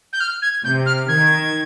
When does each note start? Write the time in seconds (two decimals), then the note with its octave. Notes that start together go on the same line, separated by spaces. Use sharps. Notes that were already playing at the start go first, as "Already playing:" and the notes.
0.13 G6
0.20 F6
0.42 G#6
0.64 C3 G6
0.86 F6
1.08 D#3 G#6